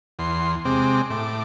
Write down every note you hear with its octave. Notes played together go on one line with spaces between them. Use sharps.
E2 C6
C3 G#3 C4 D6
A2 D6